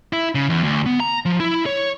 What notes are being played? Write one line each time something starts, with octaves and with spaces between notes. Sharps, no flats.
E4
C#3
E2
D2
B3
A#5
F3
E4
C#5